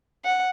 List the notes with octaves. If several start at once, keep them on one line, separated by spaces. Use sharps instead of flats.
F#5